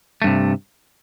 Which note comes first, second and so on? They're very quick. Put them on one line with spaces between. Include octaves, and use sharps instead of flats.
A3 G2 C3